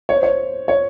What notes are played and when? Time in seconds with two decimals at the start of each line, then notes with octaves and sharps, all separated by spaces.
0.09 C#5
0.16 C5
0.23 C#5
0.68 C#5